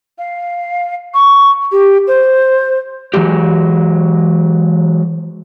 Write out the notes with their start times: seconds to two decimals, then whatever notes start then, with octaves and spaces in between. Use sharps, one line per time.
0.18 F5
1.14 C#6
1.72 G4
2.07 C5
3.14 E3 F#3 G#3 G4